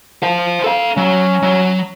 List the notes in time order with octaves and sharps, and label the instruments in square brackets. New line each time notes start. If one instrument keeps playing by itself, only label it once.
[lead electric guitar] C5 F5
A4 F5
[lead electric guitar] F#3 [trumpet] C#4
[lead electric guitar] F#3